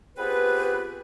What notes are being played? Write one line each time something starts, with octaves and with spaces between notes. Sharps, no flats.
B3 C4 F4 G4 G#4 B4